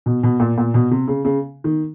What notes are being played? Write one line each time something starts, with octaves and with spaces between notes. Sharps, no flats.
B2
B2
A#2
A#2
B2
C3
C#3
C#3
D#3